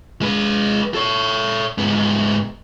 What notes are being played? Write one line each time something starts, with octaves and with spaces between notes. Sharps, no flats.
G#3 B4
A4 C#5
G#2 B3